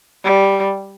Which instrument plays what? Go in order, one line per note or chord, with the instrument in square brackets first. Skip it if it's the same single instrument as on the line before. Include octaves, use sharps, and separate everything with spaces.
[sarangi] G3